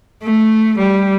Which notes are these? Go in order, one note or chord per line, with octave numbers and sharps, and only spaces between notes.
A3
G3